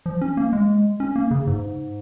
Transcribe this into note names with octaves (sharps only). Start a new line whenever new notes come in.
F3
C#4
A#3
G#3
C#4
A#3
C#3
G#2